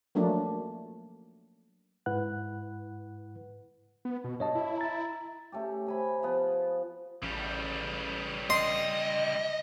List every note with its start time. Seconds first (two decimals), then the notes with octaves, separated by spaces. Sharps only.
0.15 F3 F#3 A3 A#3 D4
2.06 G#2 E4 B4 F#5 F#6
4.05 B3
4.24 B2
4.40 G2 C#5 D#5 A5
4.55 E4
4.78 A#5 A6
5.52 A3 C#4 G4
5.86 C3 G#5 B5
6.23 F3 B3
7.23 A1 C#3 G3
8.50 D#5 C6